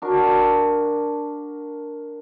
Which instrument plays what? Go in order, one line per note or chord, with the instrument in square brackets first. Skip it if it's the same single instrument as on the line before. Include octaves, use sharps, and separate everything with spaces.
[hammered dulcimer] D4 F#4 A#4